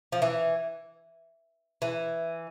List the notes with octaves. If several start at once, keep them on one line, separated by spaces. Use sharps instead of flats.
F3
E3
E3